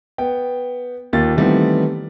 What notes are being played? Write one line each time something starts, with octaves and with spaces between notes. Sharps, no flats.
B3 G5
D#2 A#3 F4 A6
D#3 E3 G3 A3 B3 C4